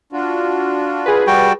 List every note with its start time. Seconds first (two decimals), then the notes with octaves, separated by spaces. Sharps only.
0.13 D4 F4 F#4
1.06 G#4 B4
1.27 G3 F#4 G5 A5